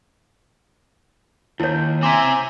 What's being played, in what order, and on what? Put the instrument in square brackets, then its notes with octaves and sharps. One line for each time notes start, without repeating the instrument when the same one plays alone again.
[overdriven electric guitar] D#2 [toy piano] E4 C#5
[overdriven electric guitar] C4 E5 [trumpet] G#5 [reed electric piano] A#5 C6 D6